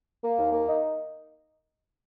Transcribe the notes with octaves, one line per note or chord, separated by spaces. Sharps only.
A#3
D#2
A#3
D#4